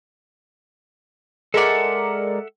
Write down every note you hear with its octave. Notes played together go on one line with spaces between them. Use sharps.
G#3 A4 A#4 D5 E5 F#5